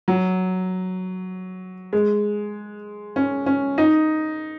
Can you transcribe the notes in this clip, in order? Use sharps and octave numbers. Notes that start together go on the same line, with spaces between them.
F#3
G#3
C#4
C#4
D#4